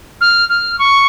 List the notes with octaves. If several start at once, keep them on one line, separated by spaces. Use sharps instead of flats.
F6
F6
C#6